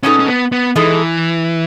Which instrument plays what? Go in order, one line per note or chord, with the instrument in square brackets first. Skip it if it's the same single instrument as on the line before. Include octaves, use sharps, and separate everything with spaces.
[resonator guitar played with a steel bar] B2 G#3 D#4 A4 [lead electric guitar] C#4
[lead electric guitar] C#4
B3
B3
[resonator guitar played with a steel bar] B2 G#3 D#4 A4 [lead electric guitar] E3